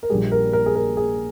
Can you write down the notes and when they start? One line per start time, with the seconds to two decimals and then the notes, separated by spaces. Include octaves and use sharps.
0.03 A#4
0.10 A#1 A#2 G3 G#4
0.32 A#4
0.53 A#4
0.66 G#4
0.75 A#4
0.97 G#4